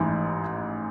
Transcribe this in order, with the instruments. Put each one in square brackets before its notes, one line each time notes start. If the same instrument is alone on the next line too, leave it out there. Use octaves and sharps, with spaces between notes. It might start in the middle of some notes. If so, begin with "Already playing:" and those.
Already playing: [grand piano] A1 G#2 E3